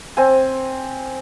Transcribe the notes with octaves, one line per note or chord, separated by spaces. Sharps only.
C4 G#5